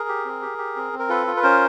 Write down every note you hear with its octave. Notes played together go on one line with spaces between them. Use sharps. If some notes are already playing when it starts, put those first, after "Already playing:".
Already playing: G#4 A#4
G4
C4
G4
G4
C4
C4
A#4
F4 A4 B4
F4
B4
C#4 A#4 C5